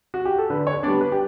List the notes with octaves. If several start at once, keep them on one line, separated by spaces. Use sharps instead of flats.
F#4
G4
A4
D3 B4
C#5
G3 B3 D4 D5
B4
G4